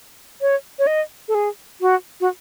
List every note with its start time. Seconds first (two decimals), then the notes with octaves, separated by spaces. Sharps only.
0.41 C#5
0.79 C#5
0.87 D#5
1.28 A4
1.35 G#4
1.81 F#4
2.21 F#4